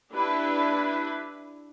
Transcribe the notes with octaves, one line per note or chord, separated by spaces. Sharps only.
D4 E4 G4 B4